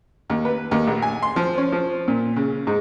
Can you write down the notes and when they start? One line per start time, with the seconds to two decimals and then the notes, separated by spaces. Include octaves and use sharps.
0.30 D#2
0.45 B4
0.71 D#2
0.87 A#1
1.02 G#5
1.22 C6
1.36 F3
1.58 C#4
1.72 F3
2.08 A#2
2.36 C#3
2.67 G#2